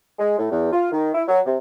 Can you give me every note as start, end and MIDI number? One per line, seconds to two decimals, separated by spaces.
0.19 0.38 56
0.39 0.51 45
0.51 0.71 40
0.73 0.90 65
0.92 1.10 51
1.14 1.23 64
1.28 1.41 54
1.46 1.57 48